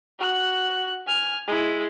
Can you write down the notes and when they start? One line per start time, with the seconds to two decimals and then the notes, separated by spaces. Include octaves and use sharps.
0.19 F#4 F#6
1.07 G#5 F6
1.47 G#3 E4